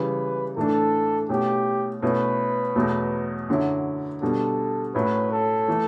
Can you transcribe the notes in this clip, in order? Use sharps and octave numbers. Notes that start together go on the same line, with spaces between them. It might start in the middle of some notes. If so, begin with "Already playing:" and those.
Already playing: C#3 E3 G3 B4
A2 E3 A3 D4 A4
B2 A3 C#4 E4 G4
B2 A3 C#4 E4 B4
E2 B2 F#3 A3
F#2 D3 F#3 C#4 E4
B2 G3 B3 D4 A4
A2 F#3 C#4 E4 B4
A4
E3 A3